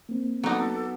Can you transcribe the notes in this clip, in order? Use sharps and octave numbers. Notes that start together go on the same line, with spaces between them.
A#3 C4
F#3 B3 D#4 A4 D6